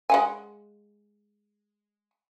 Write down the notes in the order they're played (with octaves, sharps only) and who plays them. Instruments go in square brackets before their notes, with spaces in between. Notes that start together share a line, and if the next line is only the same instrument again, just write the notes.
[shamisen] G#3 F#5 G#5